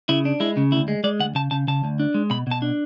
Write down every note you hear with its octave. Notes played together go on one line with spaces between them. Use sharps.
C#3 E4
D4
G#3 E4
C#3
D2 E4
G#3
G#3 D5
D2 F#5
C#3 A5
C#3 A5
C#3 A5
D2
D4
G#3
B2 B5
B2 A5
D4